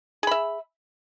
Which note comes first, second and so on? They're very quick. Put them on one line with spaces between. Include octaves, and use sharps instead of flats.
G#4 B5 E5